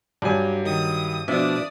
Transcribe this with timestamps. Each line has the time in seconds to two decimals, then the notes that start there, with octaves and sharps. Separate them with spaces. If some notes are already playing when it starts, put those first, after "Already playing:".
0.22 G2 F#3 D4 G#5
0.65 D#3 D#6
1.28 B2 F3 D4 D5 E5 D#6